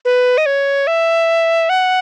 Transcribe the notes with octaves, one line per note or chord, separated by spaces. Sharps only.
B4
D#5
C#5
E5
F#5